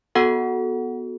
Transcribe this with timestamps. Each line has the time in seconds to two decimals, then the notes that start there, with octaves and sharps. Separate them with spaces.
0.15 B3 F#4 A4 F#5